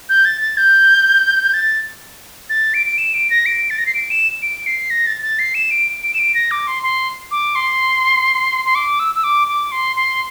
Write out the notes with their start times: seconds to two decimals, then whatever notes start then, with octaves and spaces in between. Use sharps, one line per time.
0.09 G6
0.25 A6
0.41 A6
0.57 G6
1.54 A6
2.50 A6
2.74 D7
2.86 D7
2.98 E7
3.14 D7
3.30 A#6
3.46 D7
3.70 A6
3.78 A#6
3.86 C7
3.94 D7
4.10 E7
4.42 D7
4.66 C7
4.90 A#6
5.07 A6
5.22 A6
5.39 C7
5.55 E7
5.71 D7
6.03 D7
6.14 E7
6.19 D7
6.35 A#6
6.51 D6
6.67 C6
6.83 C6
7.31 D6
7.55 C6
8.65 C6
8.75 D6
9.00 E6
9.15 E6
9.24 D6
9.48 D6
9.72 C6
9.96 C6